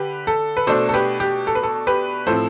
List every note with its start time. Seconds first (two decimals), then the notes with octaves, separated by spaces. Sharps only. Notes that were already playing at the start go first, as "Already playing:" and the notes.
Already playing: D3 G4 B4
0.27 A4
0.57 B4
0.67 B2 A3 D4 A4 C5
0.89 A4
0.94 G4 B4
1.20 G4
1.47 A4
1.55 B4
1.63 A4
1.87 G4 B4
2.27 A2 F3 C4 A4 C5